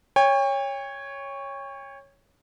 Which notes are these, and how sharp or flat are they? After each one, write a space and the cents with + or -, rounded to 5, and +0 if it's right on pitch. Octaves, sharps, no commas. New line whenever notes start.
C#5 +0 G5 +40